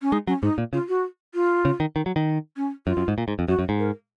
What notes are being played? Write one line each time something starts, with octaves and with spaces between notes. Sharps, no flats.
C#4
G#3 D#4
F#3 C#4
G#2 D#4
A#2
C#3 F4
F#4
F4
C#3
D#3
D#3
F#3
D#3
C#4
F#2 F4
F#2
G#2
A#2
G#2
F2
F#2 F#4
F#2
G#2
A#4